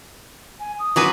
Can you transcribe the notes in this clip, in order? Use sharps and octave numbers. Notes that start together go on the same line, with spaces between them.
G#5
D#6
F#3 C#4 F#4 G#4 B4 D6